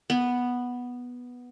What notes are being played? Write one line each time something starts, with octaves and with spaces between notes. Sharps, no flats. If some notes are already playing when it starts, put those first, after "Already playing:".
B3